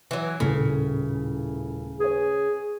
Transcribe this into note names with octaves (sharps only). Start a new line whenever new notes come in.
E3 F#3
D#1 A2 C#3 A4
G#4 B4 C#5